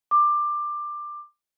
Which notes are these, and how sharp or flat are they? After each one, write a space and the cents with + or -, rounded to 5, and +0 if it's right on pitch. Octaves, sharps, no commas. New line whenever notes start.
D6 +15